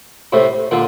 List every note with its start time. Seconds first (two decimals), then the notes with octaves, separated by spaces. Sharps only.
0.33 A2 C3
0.71 A#2 D3